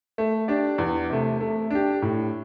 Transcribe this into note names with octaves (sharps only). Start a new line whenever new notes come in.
A3
D4 G4 D5
E2
C3 A3
A3
D4 G4
A2